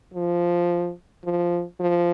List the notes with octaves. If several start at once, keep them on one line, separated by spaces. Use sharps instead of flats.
F3
F3
F3